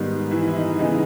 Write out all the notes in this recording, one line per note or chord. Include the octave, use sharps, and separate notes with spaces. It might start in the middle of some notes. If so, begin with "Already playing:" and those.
Already playing: G#2 D#3 G3 B3 D#4
E3 E4
E4
D#4
C#3 E3 G#3 B3 D#4